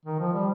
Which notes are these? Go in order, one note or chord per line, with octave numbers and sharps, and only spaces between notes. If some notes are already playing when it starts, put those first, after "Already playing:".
D#3
F3
G3